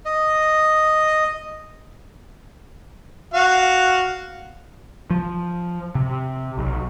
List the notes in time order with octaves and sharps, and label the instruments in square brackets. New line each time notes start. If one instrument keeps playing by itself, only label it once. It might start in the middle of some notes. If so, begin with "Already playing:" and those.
[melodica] D#5
[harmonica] F#4 F5
[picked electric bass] F3
C3
B1